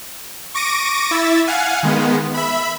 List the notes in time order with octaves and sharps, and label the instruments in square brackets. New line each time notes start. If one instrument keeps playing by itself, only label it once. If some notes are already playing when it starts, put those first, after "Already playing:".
[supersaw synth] C#6 D6 A#6 D7 D#7
E4 E5 A6
F5 F#5 G#5
D#3 G#3 B3
E5 B5